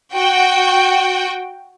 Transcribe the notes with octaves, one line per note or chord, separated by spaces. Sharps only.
F#4 G5